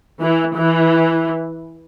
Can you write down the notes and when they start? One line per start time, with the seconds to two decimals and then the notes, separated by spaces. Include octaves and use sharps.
0.20 E3
0.55 E3